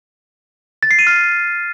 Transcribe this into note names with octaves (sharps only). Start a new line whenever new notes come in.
A6
C7
D#7
F6